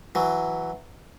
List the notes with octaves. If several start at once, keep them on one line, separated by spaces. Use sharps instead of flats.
E3 F#3